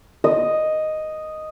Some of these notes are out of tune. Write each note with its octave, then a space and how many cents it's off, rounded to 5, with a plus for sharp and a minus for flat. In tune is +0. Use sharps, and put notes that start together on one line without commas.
D#5 +0